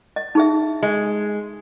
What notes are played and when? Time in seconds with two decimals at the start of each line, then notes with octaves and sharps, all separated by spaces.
0.16 D#5
0.35 D#4 G#4 E5
0.83 G#3